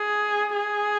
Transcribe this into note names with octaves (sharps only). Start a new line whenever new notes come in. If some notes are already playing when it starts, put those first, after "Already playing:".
Already playing: G#4
G#4